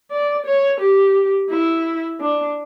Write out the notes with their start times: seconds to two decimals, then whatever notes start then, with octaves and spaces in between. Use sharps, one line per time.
0.11 D5
0.46 C#5
0.81 G4
1.50 E4
2.21 D4